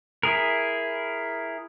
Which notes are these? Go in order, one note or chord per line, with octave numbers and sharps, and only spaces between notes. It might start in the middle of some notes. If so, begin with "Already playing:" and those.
E4 G#4 A#4